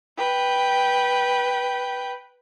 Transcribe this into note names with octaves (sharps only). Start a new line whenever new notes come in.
B4 G5